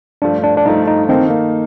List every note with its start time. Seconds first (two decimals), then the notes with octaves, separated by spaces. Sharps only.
0.22 G2 F3 A3 D4
0.43 D4
0.57 D4
0.65 G2 F3 A3 D#4
0.87 D#4
1.09 D#3 A#3 C4 D#4 A4
1.30 A#3